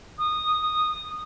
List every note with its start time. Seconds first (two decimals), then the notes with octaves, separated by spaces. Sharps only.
0.18 D#6